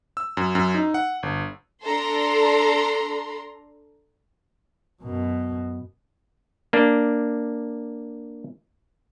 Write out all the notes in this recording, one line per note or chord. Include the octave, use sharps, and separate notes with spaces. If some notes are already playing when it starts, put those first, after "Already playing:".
E6
F#2
F#2
D#4
F#5
G1
D4 A4 A#5 C6
F#2 B2
A#3 D4